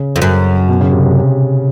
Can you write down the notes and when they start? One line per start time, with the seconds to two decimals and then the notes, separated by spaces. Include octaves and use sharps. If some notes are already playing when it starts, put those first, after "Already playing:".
Already playing: C#3
0.16 F2
0.22 F#2
0.68 B2
0.81 C#3
0.92 C3
1.04 C3